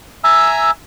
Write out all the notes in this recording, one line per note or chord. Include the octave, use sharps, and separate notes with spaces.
E5 G#5 A#5 E6